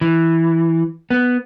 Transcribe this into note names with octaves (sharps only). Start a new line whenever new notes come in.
E3
B3